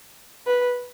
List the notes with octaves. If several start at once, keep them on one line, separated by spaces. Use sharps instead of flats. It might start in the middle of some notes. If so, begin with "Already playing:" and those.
B4